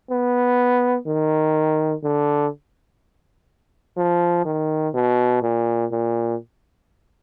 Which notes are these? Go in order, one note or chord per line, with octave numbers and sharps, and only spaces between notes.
B3
D#3
D3
F3
D#3
B2
A#2
A#2